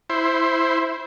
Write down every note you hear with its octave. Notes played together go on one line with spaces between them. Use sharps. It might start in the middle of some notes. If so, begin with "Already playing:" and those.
E4 C5